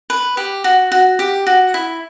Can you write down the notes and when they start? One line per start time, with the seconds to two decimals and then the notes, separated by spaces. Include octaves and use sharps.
0.10 B4
0.37 G4
0.64 F#4
0.92 F#4
1.19 G4
1.47 F#4
1.74 E4